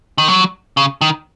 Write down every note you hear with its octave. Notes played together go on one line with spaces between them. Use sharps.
D#3
F#3
C#3
D#3